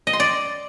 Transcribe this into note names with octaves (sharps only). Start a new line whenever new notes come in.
D#5
C6
D5